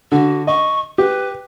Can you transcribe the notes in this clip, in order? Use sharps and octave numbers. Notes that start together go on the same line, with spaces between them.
D3 F#4
D#5 C#6
G4 B4